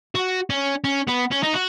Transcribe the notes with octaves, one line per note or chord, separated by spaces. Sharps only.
F#4
C#4
C#4
B3
C#4
D#4
F#4